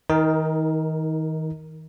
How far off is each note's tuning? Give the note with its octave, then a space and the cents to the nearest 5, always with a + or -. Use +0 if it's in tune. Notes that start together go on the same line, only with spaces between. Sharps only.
D#3 +35 D#4 +25 A#4 +0